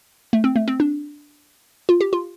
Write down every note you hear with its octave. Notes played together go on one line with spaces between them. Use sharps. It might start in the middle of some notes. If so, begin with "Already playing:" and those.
A3
C4
A3
C4
D4
F4
G4
F4